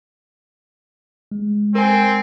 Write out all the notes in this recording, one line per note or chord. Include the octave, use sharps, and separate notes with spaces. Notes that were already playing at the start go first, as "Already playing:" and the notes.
G#3
C4 A#4 G#5